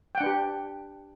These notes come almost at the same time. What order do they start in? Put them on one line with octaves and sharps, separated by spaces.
G5 F#5 D4 B4 G4